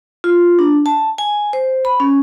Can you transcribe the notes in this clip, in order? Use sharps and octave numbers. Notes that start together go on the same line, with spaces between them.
F4
D4
A5
G#5
C5
B5
C#4